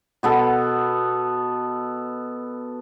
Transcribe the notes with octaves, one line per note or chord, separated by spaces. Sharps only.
B2 B3 A4